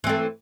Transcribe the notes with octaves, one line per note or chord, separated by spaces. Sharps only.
E3 A3 C4